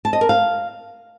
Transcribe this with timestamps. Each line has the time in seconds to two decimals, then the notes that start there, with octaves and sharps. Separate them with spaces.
0.05 A5
0.13 D#5
0.21 A#4
0.29 F5